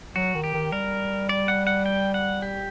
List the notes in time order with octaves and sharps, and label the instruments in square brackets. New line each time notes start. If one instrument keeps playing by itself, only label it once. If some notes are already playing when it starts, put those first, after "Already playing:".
[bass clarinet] F#3 [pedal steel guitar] F#4
[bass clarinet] D#3
[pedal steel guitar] G4
[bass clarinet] D#3
[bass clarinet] G3 [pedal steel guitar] A#4
[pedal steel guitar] D5
F#5
F#5
G5
F#5
G4